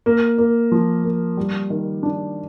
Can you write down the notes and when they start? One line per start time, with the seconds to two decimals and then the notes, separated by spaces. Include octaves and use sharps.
0.06 A#3
0.38 A#3
0.72 F3
1.04 A#3
1.37 G3
1.70 D#3
2.03 D4